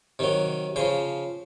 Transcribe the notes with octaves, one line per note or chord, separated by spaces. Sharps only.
C3 D#3 F#3
C#3 F3 C5